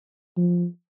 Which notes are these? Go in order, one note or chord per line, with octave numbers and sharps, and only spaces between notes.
F3